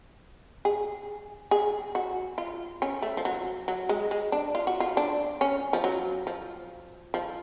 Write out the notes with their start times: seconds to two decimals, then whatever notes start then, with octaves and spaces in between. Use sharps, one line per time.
0.65 G#4
1.51 G#4
1.95 F#4
2.38 F4
2.82 C#4
3.02 A3
3.17 F3
3.25 F#3
3.68 F#3
3.89 G#3
4.11 G#3
4.32 D4
4.55 F4
4.67 F#4
4.80 F4
4.97 D4
5.41 C#4
5.73 F3
5.84 F#3
6.27 F3
7.14 F3